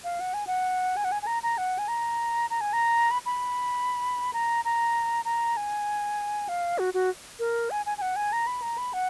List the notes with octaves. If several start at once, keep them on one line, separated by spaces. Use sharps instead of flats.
F5
F#5
G#5
F#5
G#5
F#5
G#5
G#5
A#5
A#5
F#5
G#5
A#5
A#5
G#5
A#5
B5
B5
A#5
A#5
A#5
G#5
F5
F#4
F#4
A#4
G#5
G#5
G#5
F#5
G#5
A#5
B5
A#5
B5
F#5